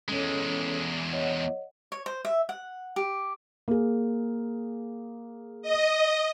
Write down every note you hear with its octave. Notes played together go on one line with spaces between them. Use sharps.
E2 G#3 C#4 A4 C#5
C#5 D#5 F#5
C#5
C5
E5
F#5
G4
A#3 G#4
D#5